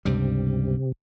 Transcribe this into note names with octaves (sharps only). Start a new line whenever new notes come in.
C#2 G2 C3 G3